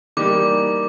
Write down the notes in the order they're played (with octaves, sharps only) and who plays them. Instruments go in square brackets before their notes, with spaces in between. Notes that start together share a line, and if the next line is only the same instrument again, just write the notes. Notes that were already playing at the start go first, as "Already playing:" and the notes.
[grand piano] E3 G3 A#3 D#4 G4 [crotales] D6